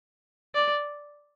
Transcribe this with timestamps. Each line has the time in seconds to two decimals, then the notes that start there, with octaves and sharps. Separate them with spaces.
0.55 D5